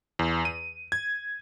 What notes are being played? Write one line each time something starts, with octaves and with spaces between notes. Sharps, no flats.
E2
D#7
G#6